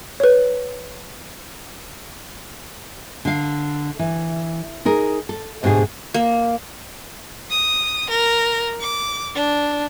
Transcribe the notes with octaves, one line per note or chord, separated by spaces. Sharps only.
B4 C#5
D3 F5
E3
D#4 G#4 A#4
A4
D2 G#2 B2 D4 G4 G#4
A#3
D#6
A#4
D6
D4